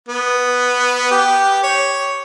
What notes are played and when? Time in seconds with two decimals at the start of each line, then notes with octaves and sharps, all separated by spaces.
0.09 B3
1.11 G4
1.63 C#5